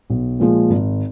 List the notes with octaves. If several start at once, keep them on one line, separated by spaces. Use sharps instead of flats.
B1
A#2 F3 G#3
G#1